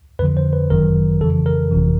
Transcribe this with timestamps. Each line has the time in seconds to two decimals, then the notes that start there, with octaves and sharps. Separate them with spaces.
0.19 F2 B4
0.22 D3 F3
0.37 C5
0.53 B4
0.70 G1 F#2 D#3 F#3 A#4
1.20 F2 C#3 E3 A4
1.46 A#4
1.71 G1 F2 C3 E3